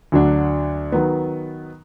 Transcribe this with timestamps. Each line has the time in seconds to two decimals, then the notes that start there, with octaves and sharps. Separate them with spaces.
0.12 D2 D3 F#3 D4
0.92 D#3 F#3 B3